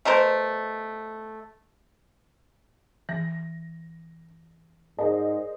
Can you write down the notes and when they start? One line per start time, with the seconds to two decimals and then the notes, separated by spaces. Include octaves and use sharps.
0.05 B2 A3 A#4 C5
3.09 E3 A#6
4.99 G#2 G#4 A#4 C5 D5 D#5